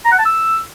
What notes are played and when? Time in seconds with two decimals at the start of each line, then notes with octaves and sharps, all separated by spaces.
0.05 A#5
0.12 F#5
0.19 A5
0.25 E6